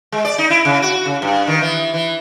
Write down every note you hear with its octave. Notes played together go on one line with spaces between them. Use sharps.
G#3
D5
D#4
E4
C#3
F#4
C#3
G2
D#3
E3
E3